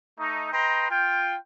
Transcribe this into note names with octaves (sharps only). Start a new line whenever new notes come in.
A3 D#4
B4 D#5 G5 A#5 C6
F4 G5